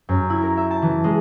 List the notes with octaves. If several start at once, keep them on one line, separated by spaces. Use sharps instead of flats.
F#2
E4
A#4
E5
A5
E3
G#3